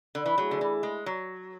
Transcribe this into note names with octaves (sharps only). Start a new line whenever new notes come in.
D3
E3
F#3 A3 E4 G#4
D3
E3
G#3
F#3